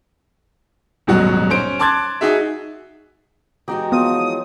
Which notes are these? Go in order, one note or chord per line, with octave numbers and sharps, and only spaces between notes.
D#1 G#2 B2 F#3 F#4 F#5
C#4 C5 D7
A5 C6 D6 F#6 G#6 A6
D#4 F#4 G#4 E5
E3 G#3 D#4 F#4 G4 G5
F3 F#3 B3 D#6